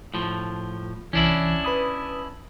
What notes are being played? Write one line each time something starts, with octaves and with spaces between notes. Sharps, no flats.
A2 F3
C2 E3 C#4 D4 E4
B4 B5 D#6